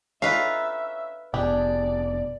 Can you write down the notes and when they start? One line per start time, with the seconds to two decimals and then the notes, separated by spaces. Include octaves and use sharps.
0.22 C#4 D#4 F4 B4 E5 F5
1.34 F1 B2 D4 G4 G#4 D5